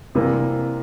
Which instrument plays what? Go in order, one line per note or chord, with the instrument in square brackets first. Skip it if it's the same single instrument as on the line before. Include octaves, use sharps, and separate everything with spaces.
[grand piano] C3 E3 G3 A#3